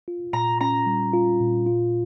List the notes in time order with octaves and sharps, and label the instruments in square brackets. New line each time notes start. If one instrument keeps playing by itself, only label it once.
[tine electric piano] F4
[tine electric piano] A#2 [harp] A#5
[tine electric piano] C#4 [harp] A#5
[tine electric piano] G3
F4
A#2
F4